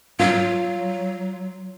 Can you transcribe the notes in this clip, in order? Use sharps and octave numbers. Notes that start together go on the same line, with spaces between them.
F#3 F4